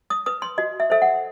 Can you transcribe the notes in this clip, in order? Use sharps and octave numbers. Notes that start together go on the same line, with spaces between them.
D#6
B4 D#6
C6
F#4 D#5
E5
A4 C5 E5
F#5